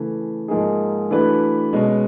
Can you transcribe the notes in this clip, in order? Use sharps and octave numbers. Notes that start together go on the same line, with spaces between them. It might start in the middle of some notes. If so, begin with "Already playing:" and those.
Already playing: C#3 E3 A3
G#2 F3 A#3 D#4 G#4
E3 A3 D4 F#4 B4
B2 G#3 C#4